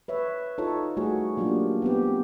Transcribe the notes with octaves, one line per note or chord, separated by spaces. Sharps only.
B4 C#5 E5
D#4 F4 A4 C#5
G3 A3 F#4 G#4 C#5
F#3 A#3 D4 F4 G4
B3 C4 G4